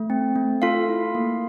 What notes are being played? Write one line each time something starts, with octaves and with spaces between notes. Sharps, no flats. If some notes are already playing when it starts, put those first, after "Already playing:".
Already playing: A3
C4
A3
F4 A4 F5
E4
A#3